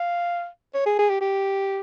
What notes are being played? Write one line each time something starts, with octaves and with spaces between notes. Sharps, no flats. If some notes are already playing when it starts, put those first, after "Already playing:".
Already playing: F5
C#5
G#4
G#4
G4
G4